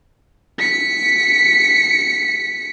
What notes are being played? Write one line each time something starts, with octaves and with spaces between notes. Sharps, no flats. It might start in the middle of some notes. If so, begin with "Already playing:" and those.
B6 C#7